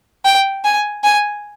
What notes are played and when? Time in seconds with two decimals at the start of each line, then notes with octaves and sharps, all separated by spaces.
0.25 G5
0.64 G#5
1.04 G#5